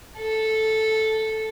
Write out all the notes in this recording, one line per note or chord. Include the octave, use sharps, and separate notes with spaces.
A4